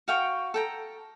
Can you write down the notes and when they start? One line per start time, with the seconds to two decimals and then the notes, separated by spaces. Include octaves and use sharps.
0.08 F#4 F5 G5 C#6
0.54 A4 G5 A#5